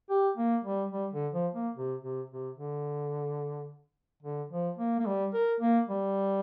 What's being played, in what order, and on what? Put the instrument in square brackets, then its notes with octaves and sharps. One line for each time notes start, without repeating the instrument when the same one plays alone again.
[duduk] G4
A#3
G3
G3
D3
F3
A#3
C3
C3
C3
D3
D3
F3
A#3
A#3
G3
A#4
A#3
G3